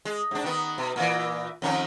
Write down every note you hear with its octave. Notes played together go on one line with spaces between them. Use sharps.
G#3
G#2 D4
D#3 B3
B2
A#2 E3
F2 D#3 C#4